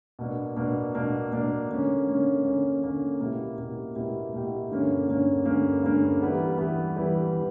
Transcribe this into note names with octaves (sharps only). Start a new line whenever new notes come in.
B2 A#3 D4
B2 A#3 D4
B2 A#3 D4
B2 A#3 D4
D3 A#3 C#4
D3 A#3 C#4
D3 A#3 C#4
D3 A#3 C#4
B2 A#3 E4 G4
B2 A#3 E4 G4
B2 A#3 E4 G4
B2 A#3 E4 G4
G2 D3 A#3 C#4
G2 D3 A#3 C#4
G2 D3 A#3 C#4
G2 D3 A#3 C#4
E3 G3 B3
E3 G3 B3
E3 G3 B3
E3